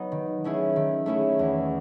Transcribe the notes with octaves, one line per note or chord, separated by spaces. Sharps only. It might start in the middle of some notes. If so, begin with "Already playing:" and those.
Already playing: F#3 B3 D#4
D#3
A3 C#4 E4 G#4
D#3
A3 C#4 E4 G#4
E2